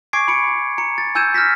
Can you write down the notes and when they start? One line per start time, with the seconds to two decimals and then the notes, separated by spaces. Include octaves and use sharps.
0.13 G#5 C#6 D6 G#6 C7 D7
0.28 B5 C#7 D7
0.78 A#5 C#7
0.98 A6
1.15 G#5 E6 G6 G#6 D#7 E7
1.34 F6 G6 A#6 B6